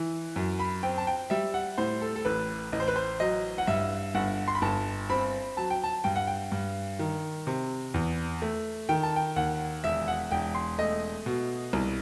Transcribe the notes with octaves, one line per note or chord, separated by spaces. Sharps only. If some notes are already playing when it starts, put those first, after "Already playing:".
Already playing: E3
F#2
B5
C4 G5
A5
G5
G3 E5
F#5
A2 C5
A4
A4
A1 B4
A1 D#5
C5
B4
C5
F#3 D#5
F#5
G2 E5
G1 F#5
C6
B5
G1 A5
C4 B5
F#3 A5
G5
A5
G2 G5
F#5
G5
G2
D#3
C3
E2
A3
D#3 G5
A5
G5
D#2 F#5
E1 E5
F#5
E1 G5
C6
A3 D#5
B2
C2